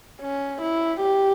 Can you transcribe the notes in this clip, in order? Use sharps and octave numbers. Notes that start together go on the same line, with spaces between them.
C#4
E4
G4